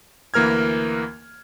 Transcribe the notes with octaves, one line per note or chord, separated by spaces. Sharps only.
D2 E3 A#3 A#4 F6 G#6